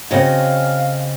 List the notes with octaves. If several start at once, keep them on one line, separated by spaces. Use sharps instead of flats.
C#3 C4 C#4 F#4 D#5 F5